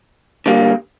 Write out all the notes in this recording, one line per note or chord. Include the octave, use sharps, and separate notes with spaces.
D3 G3 A#3